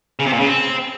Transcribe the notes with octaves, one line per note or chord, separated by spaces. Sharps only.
C#3
C3
A#2
C#3
C4